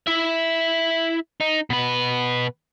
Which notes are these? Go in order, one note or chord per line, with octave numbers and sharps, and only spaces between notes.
E4 E5
D#4
B2 B4